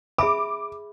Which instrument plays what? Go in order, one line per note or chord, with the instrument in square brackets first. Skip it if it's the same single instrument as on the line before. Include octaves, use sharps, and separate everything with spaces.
[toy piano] G#4 E5 B5 [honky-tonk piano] D6